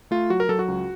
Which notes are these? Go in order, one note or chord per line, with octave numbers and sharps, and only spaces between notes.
A3 F4
F#3 F#4
A#4
F#3 A4
F#4
C#2